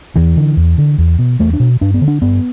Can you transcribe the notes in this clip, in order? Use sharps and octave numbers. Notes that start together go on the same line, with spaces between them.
E2 E3
D3
E2
D3
E2
B2
E2 A3
D4
B2
G2 D4
B3
D3
D4
G2 B3